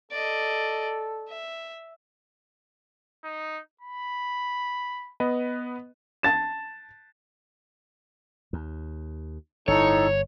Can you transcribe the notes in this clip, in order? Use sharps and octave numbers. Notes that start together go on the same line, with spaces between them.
A4 D5 D#5
E5
D#4
B5
B3 B4 D#5
A5 A6 E7
D#2
G1 A2 D#4 A4 C#5